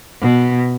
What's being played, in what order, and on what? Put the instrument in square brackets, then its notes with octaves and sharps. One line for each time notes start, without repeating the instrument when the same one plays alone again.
[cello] B2